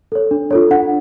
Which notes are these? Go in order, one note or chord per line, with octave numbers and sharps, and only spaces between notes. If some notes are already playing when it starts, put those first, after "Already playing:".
A4 C#5
D4
F4 A4 C#5
D4 F#5